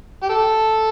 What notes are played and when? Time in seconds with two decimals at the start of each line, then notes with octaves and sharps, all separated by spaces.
0.23 G4
0.29 A4